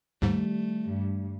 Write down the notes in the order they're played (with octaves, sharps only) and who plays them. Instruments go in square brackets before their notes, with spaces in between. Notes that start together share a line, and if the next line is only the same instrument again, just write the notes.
[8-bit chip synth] D#2 G#2 [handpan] D#3 G3 [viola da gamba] A3
[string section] G2